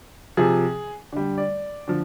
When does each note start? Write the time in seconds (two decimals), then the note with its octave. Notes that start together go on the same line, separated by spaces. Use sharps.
0.37 C3 F3 G#4
1.12 D3 G3
1.38 D5
1.88 D3 F3